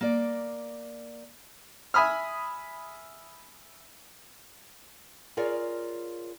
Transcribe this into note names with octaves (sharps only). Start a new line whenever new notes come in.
A#3 D5
E5 G#5 B5 D#6 F6
F4 G#4 A#4 C#5 D5 F5